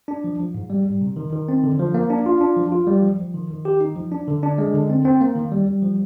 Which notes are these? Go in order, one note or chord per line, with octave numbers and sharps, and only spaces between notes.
D4
F3
F3
G#2
G3
G3
C3
D#3
D#3
C4
D3
F3
A#3
D4
F4
D4
F3
F4
G3
F3
F3
D#3
D#3
G4
D#4
F3
D4
D3
D4
G#3
D3
C4
C4
A#3
D#3
G3
G3
F3